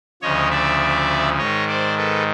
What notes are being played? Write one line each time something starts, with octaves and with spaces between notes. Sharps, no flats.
D2 C#3 F3 C#5 D#5
D5 E5
G#2 D#3 C#5 D#5
C5 D5
A4 B4